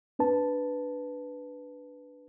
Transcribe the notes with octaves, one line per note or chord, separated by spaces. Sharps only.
C4 D4 B4 A5